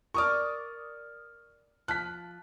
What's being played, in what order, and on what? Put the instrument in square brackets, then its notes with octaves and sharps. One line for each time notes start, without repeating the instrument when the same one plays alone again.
[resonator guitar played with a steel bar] A#4 D5 [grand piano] C#6 D#6 F6
[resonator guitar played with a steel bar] F3 [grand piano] F#6 B6